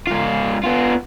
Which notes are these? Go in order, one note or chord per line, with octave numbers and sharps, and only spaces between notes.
G#2 F4
B3 F4